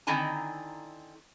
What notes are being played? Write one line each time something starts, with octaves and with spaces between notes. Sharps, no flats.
D3 D#3 C4 E4 G#5 A#5